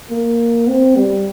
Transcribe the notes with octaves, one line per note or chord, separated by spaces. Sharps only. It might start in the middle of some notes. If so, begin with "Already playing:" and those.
A#3
C4
G3